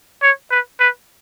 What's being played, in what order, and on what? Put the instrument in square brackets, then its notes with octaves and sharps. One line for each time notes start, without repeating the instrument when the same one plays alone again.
[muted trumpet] C#5
B4
B4